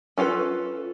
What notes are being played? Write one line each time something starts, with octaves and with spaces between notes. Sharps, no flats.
C#4 F4 F#4 A4 B4